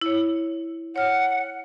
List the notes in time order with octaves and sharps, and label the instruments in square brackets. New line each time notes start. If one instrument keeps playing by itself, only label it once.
[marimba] E4 C#5
[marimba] C#5 F6 [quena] F#5